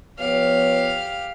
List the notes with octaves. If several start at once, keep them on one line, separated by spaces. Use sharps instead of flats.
F3 B3 G4 C#5 F5